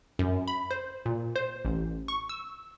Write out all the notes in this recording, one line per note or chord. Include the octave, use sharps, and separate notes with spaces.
F#2
B5
C5
A#2
C5
A1
C#6
E6